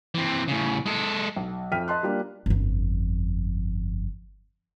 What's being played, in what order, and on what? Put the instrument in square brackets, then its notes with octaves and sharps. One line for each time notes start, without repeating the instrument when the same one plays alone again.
[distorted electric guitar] E3 C4
A2 C#3
G#3 A4
[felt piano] B1
F2 E5 G5 F6 B6 D#7
D#5 A5 C6 F#6
G3 A#3 D4 F4 G4
[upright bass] G1 F2